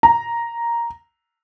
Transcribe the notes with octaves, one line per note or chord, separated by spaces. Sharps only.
A#5